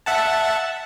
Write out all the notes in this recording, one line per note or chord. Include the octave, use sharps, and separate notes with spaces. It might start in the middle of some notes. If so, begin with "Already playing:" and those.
E5 F#5 A5